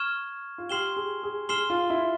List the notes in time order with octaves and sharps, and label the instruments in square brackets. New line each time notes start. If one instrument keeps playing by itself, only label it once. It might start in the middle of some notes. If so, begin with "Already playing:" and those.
Already playing: [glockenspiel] C#6 F6 G#6 E7
[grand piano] F4
[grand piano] G4 [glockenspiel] C6 F6 C7 E7 G7
[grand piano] G#4
G#4
[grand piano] G#4 [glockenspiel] C6 F6 C7 E7 G7
[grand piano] F4
E4